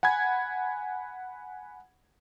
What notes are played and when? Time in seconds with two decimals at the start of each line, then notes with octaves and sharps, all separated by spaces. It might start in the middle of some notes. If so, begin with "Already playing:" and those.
0.03 F#5 G#5 B5 G#6